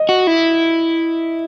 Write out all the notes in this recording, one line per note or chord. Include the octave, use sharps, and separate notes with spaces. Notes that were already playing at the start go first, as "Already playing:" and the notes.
Already playing: D#5
F#4
E4